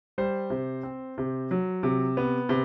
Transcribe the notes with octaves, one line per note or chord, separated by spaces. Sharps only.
G3 C5
C3
C4
C3
F#3
C3
B3
C3